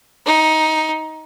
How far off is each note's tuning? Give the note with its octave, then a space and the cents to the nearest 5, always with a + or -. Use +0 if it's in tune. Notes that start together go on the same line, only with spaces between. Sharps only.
D#4 +15